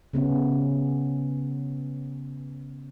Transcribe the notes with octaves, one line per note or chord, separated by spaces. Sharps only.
C#3 B3 C#4